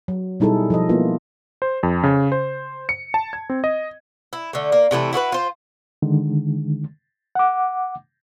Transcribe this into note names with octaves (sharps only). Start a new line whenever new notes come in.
F#3
B2 G3 D#4 E4 G#4 A4
F3 A4 D#5
A#3 B3 E4 F4
C5
F2
C#3
C5
C#7
A5
G#6
C4
D#5
E4
D3 A3
A#3
C3 E3 A3 E4
E4 F#4 A4 B4
F4 C5
D3 D#3 G#3
F#5 D6